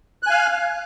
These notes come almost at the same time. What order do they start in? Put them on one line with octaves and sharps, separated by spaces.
F#6 G#5 F5